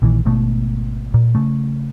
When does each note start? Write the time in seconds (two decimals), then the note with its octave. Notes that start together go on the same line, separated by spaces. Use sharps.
0.02 A#1 A#2 D#3 E3
0.25 G#1 G#2 B2 A3
1.14 A#2
1.35 C#3 A3